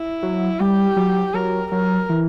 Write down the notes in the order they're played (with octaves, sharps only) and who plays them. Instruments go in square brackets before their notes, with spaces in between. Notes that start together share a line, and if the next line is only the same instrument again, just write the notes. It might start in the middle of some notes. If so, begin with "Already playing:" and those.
Already playing: [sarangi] E4
[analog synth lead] F#3
[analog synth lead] G3 [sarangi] G4
[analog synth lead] F#3
[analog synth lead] F#3 [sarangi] A#4
[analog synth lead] F#3 [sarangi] A#4
[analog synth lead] E3